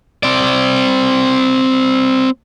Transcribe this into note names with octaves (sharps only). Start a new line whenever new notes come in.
C4 D5